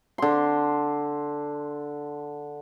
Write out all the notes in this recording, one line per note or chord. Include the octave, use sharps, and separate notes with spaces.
D3 C6